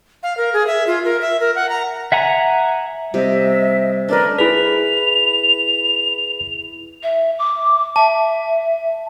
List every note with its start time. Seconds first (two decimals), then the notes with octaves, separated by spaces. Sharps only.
0.23 F5
0.37 A#4
0.53 G#4
0.67 E5
0.87 F4
1.05 A#4
1.21 E5
1.41 A#4
1.56 F#5
1.69 A#5
2.12 E5 F#5 G#5 A#5
3.14 C3 G3 G4 D#5 E5
4.09 A3 C#4 D4 A#4 B4 D5
4.38 E4 G#4 B4 B6 F7
7.02 E5
7.38 D6
7.96 E5 A5